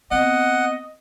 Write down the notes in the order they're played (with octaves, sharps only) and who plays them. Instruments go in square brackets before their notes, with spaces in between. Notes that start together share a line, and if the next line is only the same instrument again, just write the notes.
[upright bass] B3 C4 [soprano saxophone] D#5 [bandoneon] F#5